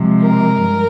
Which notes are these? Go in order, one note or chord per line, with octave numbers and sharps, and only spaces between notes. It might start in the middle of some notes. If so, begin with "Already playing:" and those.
Already playing: C3 F3 G#3
A#4
G2